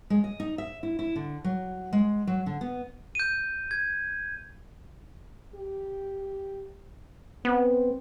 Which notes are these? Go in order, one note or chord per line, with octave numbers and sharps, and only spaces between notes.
G#3
D#5
D#4
E5
E4
E4
D3
F#3
G#3
F#3
D3
B3
G6 D#7
G#6
G4
B3 C4